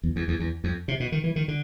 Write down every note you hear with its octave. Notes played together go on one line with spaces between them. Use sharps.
E2
E2
E2
E2
F2
C3
B2
D#3
E3
D#3
D3